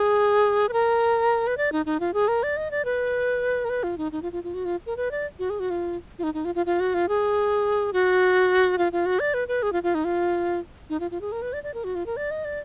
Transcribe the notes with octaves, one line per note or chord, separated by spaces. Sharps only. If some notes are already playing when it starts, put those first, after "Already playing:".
Already playing: G#4
B4
A#4
B4
D5
D#4
D#4
F4
G#4
A#4
D5
D#5
D5
B4
A#4
B4
F4
D#4
D#4
F4
F4
F4
F#4
F4
A#4
B4
D5
F#4
G#4
F#4
F4
F4
D#4
D#4
F4
F4
F4
F#4
F4
G#4
F#4
F4
F4
F#4
D5
B4
B4
G#4
F4
F4
D#4
F4
D#4
F4
F4
G#4
A#4
B4
D5
D5
A#4
F#4
F4
A#4
D5
D#5
D5